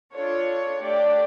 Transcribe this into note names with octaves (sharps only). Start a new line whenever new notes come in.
D4 F4 A4 C#5
A3 D4 G4 D5